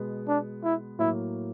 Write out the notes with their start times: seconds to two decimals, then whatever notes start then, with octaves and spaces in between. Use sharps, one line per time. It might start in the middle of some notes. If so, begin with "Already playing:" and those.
Already playing: B2 G#3 B3
0.28 D4
0.64 E4
0.99 A2 F#3 A#3 E4